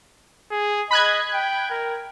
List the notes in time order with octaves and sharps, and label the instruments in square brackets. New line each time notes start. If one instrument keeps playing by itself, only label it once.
[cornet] G#4
[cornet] D#5 [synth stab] B5 F#6 G#6
[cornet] G5
A#4